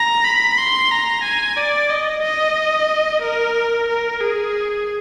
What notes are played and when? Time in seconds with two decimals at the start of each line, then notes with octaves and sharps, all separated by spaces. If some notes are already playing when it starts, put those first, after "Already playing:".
Already playing: A#5
0.25 B5
0.57 C6
0.91 A#5
1.23 G#5
1.57 D5
1.90 D#5
2.22 D#5
3.22 A#4
3.88 A#4
4.20 G#4